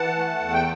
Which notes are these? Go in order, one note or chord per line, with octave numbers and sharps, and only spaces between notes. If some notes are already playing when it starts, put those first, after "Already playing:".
Already playing: E3 F#5 A5
A3
E2
G5